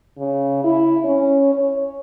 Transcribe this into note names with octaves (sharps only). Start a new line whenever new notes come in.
C#3
E4
C#4
C#5